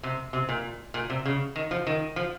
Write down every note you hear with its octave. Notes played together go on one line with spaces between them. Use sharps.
C3
C3
A#2
A#2
C3
C#3
D#3
F3
D#3
F3